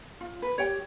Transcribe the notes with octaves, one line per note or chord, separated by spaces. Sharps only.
F4
B4
G4 C#5 G5